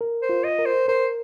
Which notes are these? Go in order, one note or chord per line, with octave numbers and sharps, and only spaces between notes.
A#4
C5
F4
D#5
A#4
C5
A#4 C5